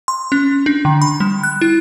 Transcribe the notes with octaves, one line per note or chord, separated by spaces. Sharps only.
C6
C#4
D4
D3
B5
G3
F#6
E4